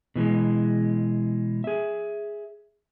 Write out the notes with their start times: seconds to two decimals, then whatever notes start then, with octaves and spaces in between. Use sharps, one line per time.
0.15 B2 E3 G3 G#3
1.64 G#4 E5